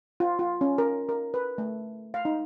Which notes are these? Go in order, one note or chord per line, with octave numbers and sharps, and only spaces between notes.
F4
F4
C#4
A#4
A#4
B4
A3
F5
D#4